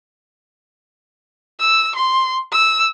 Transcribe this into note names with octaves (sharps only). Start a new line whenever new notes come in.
E6
C6
E6